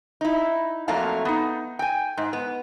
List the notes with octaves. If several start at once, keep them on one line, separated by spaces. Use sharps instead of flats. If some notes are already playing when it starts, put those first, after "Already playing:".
D#4 E4
F2 F#3 A3 A#3 F5 A5
B3 D#4
G5 G#5
G#2
B3